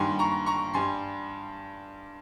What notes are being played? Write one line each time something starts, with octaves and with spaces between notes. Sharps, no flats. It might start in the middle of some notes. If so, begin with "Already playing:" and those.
Already playing: G2 D#3 G3 G#5 C6
A#5 C#6
A#5 C#6
G2 G3 G#5 C6